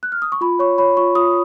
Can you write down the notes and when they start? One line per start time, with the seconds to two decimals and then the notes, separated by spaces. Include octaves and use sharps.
0.03 F#6
0.12 F6
0.22 D#6
0.32 C#6
0.41 F4 B5
0.59 C#5 C#6
0.78 C#5 B5
0.97 F4 C#6
1.15 F4 D#6